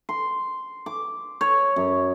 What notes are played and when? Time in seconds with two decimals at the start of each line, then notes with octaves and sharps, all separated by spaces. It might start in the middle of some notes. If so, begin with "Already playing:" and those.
0.09 C6
0.86 D6
1.41 C#5
1.76 F#2